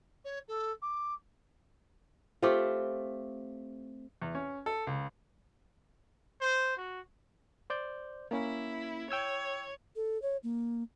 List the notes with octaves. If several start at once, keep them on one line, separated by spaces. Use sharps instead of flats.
C#5
A4
D6
A3 C4 F4 G4
E2
C#4
A4
C#2
C5
F#4
C5 D5 G6
A#3 C#4 E4
C#5 G5 E6 G#6
A4
C#5
A#3